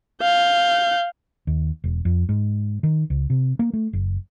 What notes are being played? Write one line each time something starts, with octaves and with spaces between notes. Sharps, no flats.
F5 G6
D#2
E1
F2
G#2
D#3
C#2
C3
A#3
A3
F#1